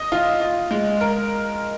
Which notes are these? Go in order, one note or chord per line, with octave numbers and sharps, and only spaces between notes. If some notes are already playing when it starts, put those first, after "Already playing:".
Already playing: D#5
F4
F4
G#3
A#4